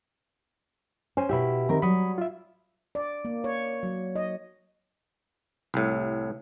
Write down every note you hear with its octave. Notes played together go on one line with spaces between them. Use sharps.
C#4 C5 G#5
B2 E4 G4 E5 B5
D#3 C4 A#4
F#3 G3 B5 D#6
F4 E5
D5
A#3
C#5
F#3
D#5
C2 A2